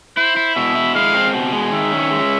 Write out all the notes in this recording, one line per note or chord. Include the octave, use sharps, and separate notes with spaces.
E4 C5
E4
B2 E5
E4
G#3 F5
C4
B2
G#3
D#3 E5
C#4
G#3